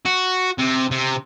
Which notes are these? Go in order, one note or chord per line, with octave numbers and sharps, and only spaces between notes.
F#4
C3
C3